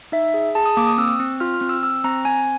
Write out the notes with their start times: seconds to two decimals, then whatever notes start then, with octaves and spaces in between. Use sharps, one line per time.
0.12 D#4 E5
0.34 G#4
0.55 G#4 A5
0.66 D#6
0.77 A#3 D6
0.87 D#6
0.98 C4 E6
1.19 C4
1.40 F4 F6
1.54 F6
1.61 C4
1.69 E6
1.83 C4 E6
2.04 C4 A#5
2.25 C4 G#5